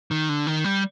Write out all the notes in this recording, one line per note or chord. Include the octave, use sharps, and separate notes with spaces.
D#3
D3
D#3
G3